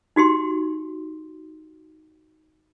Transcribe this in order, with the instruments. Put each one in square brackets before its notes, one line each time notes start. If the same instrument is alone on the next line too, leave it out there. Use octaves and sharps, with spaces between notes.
[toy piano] D#4 F#4 G4 C6